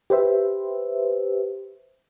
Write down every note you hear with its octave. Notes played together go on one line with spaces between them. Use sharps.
G4 B4 C5 E5